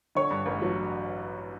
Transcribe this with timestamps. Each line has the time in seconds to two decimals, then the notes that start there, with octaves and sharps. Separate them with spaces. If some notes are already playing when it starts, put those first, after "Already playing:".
0.15 D3 C#5 C#6
0.31 G2
0.46 A1
0.62 F#3